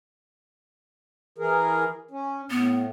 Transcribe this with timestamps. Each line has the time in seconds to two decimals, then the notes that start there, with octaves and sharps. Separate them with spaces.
1.38 E3 G#4 A#4
2.11 C#4
2.50 A2 B3